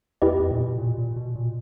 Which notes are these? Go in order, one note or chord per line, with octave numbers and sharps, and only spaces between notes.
E2 E4 G4 B4 D#5
F2
A#2
B2
A#2
A#2
B2
A#2